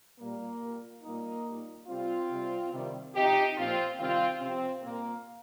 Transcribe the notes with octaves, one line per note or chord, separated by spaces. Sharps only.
A#2 G3 A#3
A#2 G3
A#2 G3 A#3 D#4
A#2 G3
C3 G3 C4 F4
C3 G3
C3 D#3 G3
C3 F3 D#4 G4
A#2 F3 C4 F4
C3 D#3 G3 C4 F4
C3 F3 C4
A#2 G3 A#3